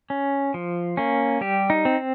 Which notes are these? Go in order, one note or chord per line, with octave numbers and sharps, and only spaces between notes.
C#4
F3
A#3 C#4
G3 G4
D#4
C4